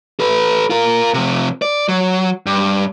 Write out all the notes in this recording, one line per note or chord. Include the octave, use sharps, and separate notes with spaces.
A4 B4
F4 A#4
C3 F3
D5
F#3
G2